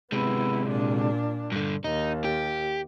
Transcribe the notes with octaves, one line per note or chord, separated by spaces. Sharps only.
C3 G#3 B3 E4
A#2 D4
G2 D3
D#2 D#4
G4